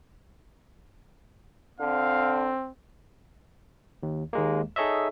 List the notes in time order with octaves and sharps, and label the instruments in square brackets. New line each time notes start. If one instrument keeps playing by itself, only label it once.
[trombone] D3 [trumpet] C4 [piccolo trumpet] F5
[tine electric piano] D#2
D#2 G#3 A#3
D#4 G#4 A4 C#5 D#5 E5